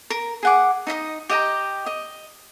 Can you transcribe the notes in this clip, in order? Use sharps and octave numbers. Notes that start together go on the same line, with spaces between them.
A#4
G#4 F#5 D6
D#4 D#5 E5 D#6
G4 D#5 G5 A#5
D#5